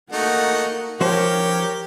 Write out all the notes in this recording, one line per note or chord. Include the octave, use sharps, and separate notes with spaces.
A3 A#3 D#4 F#4 F#5
F3 C#4 G4 A#4 C5 C#5